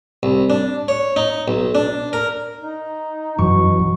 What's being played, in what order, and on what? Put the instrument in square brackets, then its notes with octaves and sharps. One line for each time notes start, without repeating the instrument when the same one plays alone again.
[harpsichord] C2
D4
C#5
D#4
B1
D4
A#4
[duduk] D#4
[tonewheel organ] F#2 E3 F#3 [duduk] B2 [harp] C#6